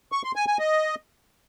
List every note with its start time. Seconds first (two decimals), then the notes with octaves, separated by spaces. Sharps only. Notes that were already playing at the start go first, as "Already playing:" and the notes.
0.12 C#6
0.24 C6
0.36 G#5
0.47 G#5
0.59 D#5